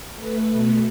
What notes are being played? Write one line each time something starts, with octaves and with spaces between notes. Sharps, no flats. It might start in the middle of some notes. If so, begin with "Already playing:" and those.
A3 B4
B2 A3